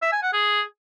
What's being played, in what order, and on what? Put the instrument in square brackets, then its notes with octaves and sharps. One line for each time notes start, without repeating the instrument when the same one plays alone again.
[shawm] E5
G#5
F#5
G#4